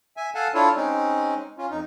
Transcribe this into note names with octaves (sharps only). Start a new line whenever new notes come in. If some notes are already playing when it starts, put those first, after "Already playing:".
E5 G#5
A4 F5 F#5 G#5 A5
D4 E4 F4 A4 C#5
G#3 C4 C#4 D#4
C#4 F4
F2 D#4